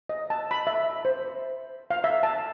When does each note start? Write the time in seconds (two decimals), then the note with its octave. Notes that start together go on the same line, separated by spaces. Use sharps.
0.09 D#5
0.30 A5
0.51 B5
0.67 E5
1.05 C5
1.90 F5
2.04 E5
2.23 A5